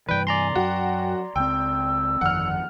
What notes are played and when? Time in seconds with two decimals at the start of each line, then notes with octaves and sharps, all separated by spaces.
0.09 G2 C3 E3 B4 D5 G5
0.27 D5 G#5 A#5 C6
0.55 F#2 F#3 F#4 G5
1.36 C#2 C4 G5 E6
2.21 G1 F2 D#3 F#5 F6